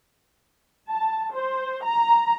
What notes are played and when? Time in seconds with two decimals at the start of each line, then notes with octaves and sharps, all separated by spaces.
0.90 A5
1.35 C5
1.84 A#5